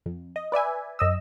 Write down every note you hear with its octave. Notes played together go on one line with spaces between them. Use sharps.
F2
D#5
B4 D5 E5 G#5
F#2 D#5 E6